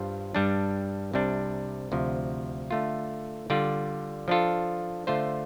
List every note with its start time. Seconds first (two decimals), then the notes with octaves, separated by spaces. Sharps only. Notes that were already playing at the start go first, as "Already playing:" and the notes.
Already playing: G2 G3 F4 C5
0.35 G2 G3 D4
1.14 C2 C3 G3 D4
1.92 D2 C3 F3
2.71 D3 A3 F4
3.50 D3 G3 F4 D5
4.28 F3 D4 F4 A4
5.07 D3 A3 F4 C5